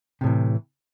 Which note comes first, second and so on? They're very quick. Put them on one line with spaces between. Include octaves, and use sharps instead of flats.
C3 A2 E3